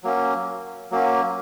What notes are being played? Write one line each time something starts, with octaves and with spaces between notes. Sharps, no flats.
F#3 A#3 C#4
F#3 A#3 C#4